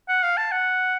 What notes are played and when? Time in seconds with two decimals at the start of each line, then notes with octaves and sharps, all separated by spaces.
0.08 F#5
0.23 F5
0.37 A5
0.52 F#5